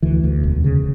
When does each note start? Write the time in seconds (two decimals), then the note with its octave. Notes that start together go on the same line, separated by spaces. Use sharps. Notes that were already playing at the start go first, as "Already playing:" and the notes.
0.02 D2 E3
0.24 D2
0.43 E1
0.64 C#3